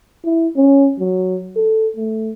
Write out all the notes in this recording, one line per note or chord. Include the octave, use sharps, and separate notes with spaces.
E4
C#4
F#3
A4
A3